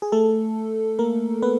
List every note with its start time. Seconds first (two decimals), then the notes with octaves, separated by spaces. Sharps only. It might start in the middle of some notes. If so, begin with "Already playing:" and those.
0.02 G#4
0.12 A3 A4
0.99 A#3 A#4
1.42 B3 B4